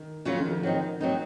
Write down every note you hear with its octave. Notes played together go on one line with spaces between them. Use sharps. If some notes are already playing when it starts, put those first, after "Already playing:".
Already playing: D#3
C#3 F3 F#3 C#4 F4
D#3
F3
D#3 F#3 C4 D#4
F#3 C4 D#4